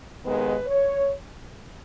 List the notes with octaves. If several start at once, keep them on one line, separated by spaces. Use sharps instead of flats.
D#2 D#3 G#3 B3 B4
C#5